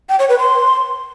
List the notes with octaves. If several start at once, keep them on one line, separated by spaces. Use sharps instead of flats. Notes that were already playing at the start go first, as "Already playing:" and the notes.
G5
C#5
B4
C6